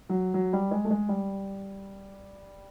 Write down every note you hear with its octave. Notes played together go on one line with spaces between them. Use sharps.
F#3
F#3
G3
G#3
A3
G#3
G3